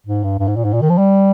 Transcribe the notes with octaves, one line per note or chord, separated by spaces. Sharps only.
G#2
G2
G2
G#2
A#2
G#2
A#2
D#3
F3
G3